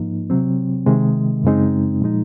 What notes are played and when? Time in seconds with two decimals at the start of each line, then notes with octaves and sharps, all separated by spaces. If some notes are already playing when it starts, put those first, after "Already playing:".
Already playing: G#2 F3 A#3 D#4
0.30 C3 F#3 C4
0.86 C3 D#3 G#3
1.44 F#2 C#3 G#3 C4 D#4
2.02 A#2 F3 G#3 D#4